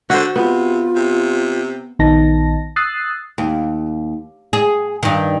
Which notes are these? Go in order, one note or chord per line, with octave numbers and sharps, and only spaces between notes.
D3 F#4 C5
C3 B3 F4
C3
A#1 D#3 B3 D#4 A5 A#6
D#6 E6 F#6 A6 C7
D#2
G#4
G2 D#3